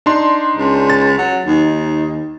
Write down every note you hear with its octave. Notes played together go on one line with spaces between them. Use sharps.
D4 D#4 C6
C#2
A6
F#3
D#2 D#4